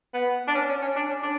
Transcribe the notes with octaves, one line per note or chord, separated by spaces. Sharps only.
B3
D4
C#4
C#4
C#4
D4
C#4
D4